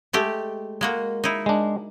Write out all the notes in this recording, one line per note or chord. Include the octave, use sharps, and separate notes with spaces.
G#3 A3 G4
G#3 A#3 F#4
D#4 E4
G#3 D4